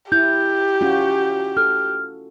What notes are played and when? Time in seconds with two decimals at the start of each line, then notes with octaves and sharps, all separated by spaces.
0.12 E4 G4 G6
0.81 C#4 F4 F#4
1.57 A4 F6